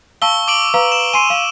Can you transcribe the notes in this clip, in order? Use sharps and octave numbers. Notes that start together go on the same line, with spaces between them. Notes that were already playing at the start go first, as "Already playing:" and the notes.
F5 A5 C#6 E6 G7
D6 D7 F#7
B4 F5 A#5
E7
G#5 C6 C7 D#7
F5